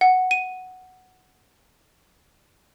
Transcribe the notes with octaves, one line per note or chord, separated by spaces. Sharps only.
F#5
D#7